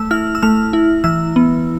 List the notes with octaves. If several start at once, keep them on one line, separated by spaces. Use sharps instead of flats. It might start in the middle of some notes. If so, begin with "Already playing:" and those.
Already playing: A3 E6
E4 F6
E6
A3 F6
E4
E3 E6
B3